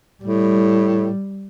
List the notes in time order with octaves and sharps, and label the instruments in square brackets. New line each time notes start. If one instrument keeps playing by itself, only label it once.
[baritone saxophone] A2 [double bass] G3